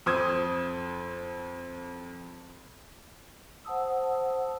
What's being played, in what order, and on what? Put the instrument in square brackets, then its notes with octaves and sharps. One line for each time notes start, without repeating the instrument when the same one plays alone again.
[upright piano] F2 C5 D#6 G#6
[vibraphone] C5 F#5 A5 D#6 E6